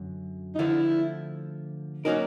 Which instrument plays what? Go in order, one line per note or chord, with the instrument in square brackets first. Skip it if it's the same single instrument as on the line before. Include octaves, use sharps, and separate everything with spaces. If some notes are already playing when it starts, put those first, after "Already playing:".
Already playing: [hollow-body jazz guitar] F#2 D3 F#3
[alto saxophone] D#4
[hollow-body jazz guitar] D3 F3 A3 [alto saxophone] E4
[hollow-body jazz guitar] F#3 A#3 C#4 F#4 A#4 [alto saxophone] D#4